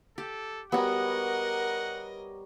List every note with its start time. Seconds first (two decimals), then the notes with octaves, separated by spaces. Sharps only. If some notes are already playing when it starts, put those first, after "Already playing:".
0.18 G4 A4
0.72 G3 B3 F#4 A#4 C#5 D#5 F#5